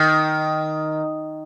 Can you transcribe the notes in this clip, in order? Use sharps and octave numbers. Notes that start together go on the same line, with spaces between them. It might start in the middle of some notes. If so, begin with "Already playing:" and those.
Already playing: D#3